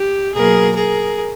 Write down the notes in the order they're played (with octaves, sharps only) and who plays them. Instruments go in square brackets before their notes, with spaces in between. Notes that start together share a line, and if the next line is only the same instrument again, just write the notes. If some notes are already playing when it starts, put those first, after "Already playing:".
Already playing: [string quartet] G4
B2 F#3 A#3 G#4 A#4
G#4 A#4